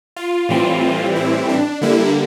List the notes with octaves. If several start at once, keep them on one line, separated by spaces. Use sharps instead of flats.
F4
A2 E3 G3 C4
E4
D4
D3 G3 A#3 E4